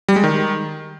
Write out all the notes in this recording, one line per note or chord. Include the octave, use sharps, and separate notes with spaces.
G3
G#3
D#3